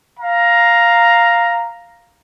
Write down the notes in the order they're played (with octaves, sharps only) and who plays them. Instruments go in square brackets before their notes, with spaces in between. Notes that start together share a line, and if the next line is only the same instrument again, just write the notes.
[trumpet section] F5 A#5